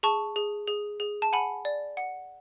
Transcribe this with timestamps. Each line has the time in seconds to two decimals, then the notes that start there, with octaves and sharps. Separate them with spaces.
0.03 G#4 A5 C#6
0.36 G#4
0.68 G#4
1.00 G#4
1.22 A5
1.33 F#5 G#5 B5
1.65 D5
1.97 F#5